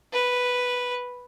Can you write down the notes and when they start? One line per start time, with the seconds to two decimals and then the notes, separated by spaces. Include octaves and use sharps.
0.13 B4